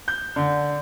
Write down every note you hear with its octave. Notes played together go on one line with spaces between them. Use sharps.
G6
D3